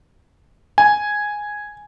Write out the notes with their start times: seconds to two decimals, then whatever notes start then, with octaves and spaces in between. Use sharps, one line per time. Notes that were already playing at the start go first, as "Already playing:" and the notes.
0.78 G#5